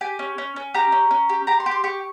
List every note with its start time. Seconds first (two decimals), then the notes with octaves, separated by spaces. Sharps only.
0.01 G4 G#5
0.19 C#4
0.38 C#4
0.56 C#4
0.74 G4 A#5
0.92 C#4
1.11 C#4
1.29 G4
1.47 G4 A#5
1.60 C6
1.66 G4
1.71 C6
1.84 G4 C#6